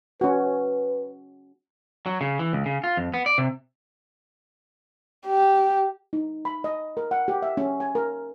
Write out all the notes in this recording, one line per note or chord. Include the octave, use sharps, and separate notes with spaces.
C#4 F#4 B4
F#3
C#3
E3
C#2
C#3
F4
F2
B3
D5
C3
G4
D#4
B5
D#5
A#4
F#5
G4
E5
C#4
G#5
A#4